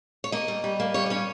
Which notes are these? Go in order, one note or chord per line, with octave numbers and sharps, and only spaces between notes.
C#5
A#3 D#5
G3
G3
A#3
G3 C#5
D#5
C#4 C#5